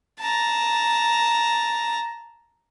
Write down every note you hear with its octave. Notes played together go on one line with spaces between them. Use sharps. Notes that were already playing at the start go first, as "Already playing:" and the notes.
A5 A#5